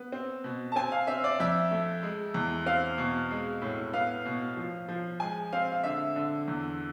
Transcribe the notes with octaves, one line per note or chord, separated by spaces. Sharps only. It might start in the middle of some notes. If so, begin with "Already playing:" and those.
Already playing: B3
C4
B2
A5
C4 G#5
F5
C4 E5
D5
F2 E5
A3
G#3
E2
C4 F5
B2
G#3
A2
B3 F5
B2
F3
F3
G#3 G#5
C4 F5
F5
D3 E5
D3
E2